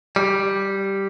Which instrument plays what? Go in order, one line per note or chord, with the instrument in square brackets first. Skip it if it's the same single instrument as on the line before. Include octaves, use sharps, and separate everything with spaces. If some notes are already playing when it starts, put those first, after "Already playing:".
[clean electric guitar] G3